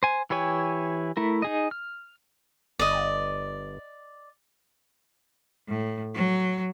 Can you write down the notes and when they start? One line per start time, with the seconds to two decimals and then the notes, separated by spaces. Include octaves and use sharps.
0.03 C5 G#5
0.30 E3 E4 G4 C#5 G#5
1.17 A3 E4 A#4
1.42 D#4 G#4 D#5
1.71 F6
2.79 G1 D5 D#5
5.68 A2
6.14 F#3